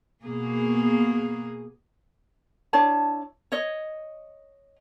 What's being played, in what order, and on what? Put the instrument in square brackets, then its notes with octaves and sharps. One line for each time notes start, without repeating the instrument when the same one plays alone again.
[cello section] B2 A#3 G#4
[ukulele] D4 E4 C#5 A5
C#5 D#5